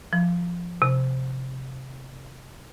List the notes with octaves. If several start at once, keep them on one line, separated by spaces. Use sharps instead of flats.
F3
C3